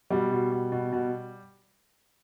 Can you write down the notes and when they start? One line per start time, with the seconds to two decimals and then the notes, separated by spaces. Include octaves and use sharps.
0.10 B2 G3
0.31 B2
0.52 B2
0.72 B2
0.92 B2